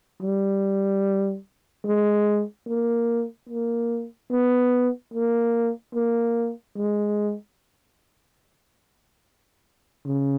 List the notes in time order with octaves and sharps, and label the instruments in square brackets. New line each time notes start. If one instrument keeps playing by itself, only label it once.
[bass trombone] G3
G#3
A#3
A#3
B3
A#3
A#3
G#3
C#3